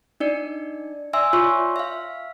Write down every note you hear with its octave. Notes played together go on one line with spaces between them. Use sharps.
D4 D#4 D5 C#7
D5 E5 G#5 C6 E6
F4 C#5 C6 C#6
E5 F5